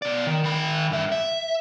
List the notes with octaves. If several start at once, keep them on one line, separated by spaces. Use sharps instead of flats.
B2 D5
D#3
D#3 B5
G2 E5
E5